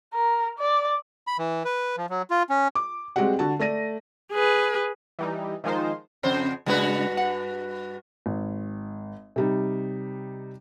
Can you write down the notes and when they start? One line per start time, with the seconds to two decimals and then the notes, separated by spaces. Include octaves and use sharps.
0.14 A#4
0.58 D5
1.27 B5
1.39 E3
1.65 B4
1.97 F3
2.10 F#3
2.30 F4
2.50 C#4
2.75 D6
3.16 G3 G#3 C4 F#4 G4 F#5
3.39 D3 F#4 A5
3.59 A3 D5 A#6 D#7
4.33 G#4 B4
5.19 E3 G3 D#4
5.64 D#3 F3 G#3 D#4 F4 C5
6.23 F2 C#3 C5
6.66 G2 C#3 G#3 D4 F#4 B4
7.17 F#5
8.26 G#1
9.36 C3 G3 D#4